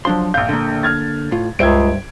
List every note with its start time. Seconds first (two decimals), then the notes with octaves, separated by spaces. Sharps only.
0.05 F3 F#3 D4 C6
0.34 A#1 F5 G6
0.49 D3 A#3
0.83 F6 G#6 A6
1.32 A2 F4
1.59 C#2 G2 C5 E5 G#6 D7